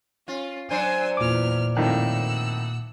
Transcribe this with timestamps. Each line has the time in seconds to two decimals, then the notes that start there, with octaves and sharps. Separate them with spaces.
0.28 C#4 F4
0.71 F#3 D4 C5 G#5 C6 E6
1.17 E2 A#2 D6 F6
1.77 F2 A2 D#3 F#5 E6